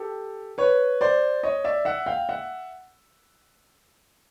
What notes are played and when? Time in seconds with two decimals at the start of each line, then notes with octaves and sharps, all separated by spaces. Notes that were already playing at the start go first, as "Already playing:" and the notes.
Already playing: G4 A4
0.58 B4 C#5
1.01 C5 D5
1.43 C#5 D#5
1.64 D5 E5
1.85 E5 F#5
2.06 F5 G5
2.29 E5 F#5